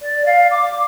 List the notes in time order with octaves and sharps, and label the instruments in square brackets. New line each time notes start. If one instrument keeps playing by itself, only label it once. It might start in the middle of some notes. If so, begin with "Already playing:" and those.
[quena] D5
F5
D6